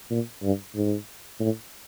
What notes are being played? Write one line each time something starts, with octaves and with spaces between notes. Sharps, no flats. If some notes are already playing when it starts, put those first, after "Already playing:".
A#2
G2
G#2
A2